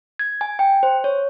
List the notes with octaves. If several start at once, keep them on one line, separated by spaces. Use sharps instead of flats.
G#6
G#5
G5
C5
C#5